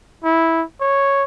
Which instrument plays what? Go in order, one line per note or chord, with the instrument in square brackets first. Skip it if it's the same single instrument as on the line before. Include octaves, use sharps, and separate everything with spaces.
[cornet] E4
C#5